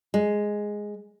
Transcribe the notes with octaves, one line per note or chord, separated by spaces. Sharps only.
G#3